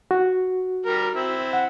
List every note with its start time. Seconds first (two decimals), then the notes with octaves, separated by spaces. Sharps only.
0.11 F#4
0.86 G3 A#4
1.15 C4 E4
1.53 F#5